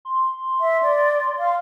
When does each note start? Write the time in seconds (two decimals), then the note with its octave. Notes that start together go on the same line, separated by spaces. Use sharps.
0.05 C6
0.61 E5
0.83 D5
1.39 F5